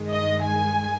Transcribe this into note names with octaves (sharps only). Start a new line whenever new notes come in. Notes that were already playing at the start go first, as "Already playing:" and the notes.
Already playing: G2 D#3 G#3
D#5
G#5